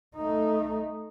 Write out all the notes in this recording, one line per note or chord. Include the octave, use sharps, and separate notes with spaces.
A3 D#4